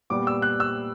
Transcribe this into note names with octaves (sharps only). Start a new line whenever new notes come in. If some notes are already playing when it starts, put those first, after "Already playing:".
A#2 G3 B3 D6
E6
F#6
E6